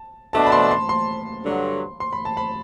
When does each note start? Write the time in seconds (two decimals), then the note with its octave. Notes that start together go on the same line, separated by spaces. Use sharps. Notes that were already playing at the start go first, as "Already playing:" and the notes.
Already playing: A5
0.33 B2 A3 D4 A5
0.47 B5
0.52 C6
0.71 C6
0.89 C6
1.45 G2 D3 F#3
2.00 C6
2.13 B5
2.25 A5
2.37 B5